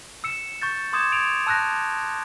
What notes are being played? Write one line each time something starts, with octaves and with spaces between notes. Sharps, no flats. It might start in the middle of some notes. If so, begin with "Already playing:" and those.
E6 C#7 E7
C#6 G6 A6
C6 D6 D#6 G6 G#6 E7
G#6 D7 F7
A5 E6 F#6 G6 A#6